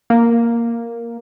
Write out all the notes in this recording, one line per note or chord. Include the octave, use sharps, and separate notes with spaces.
A#3